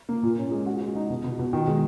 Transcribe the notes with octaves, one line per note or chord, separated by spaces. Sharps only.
A#3
A#2
C#4
G#3
F#4
G#3
D#4
B2
B2
B2
D#3
G#3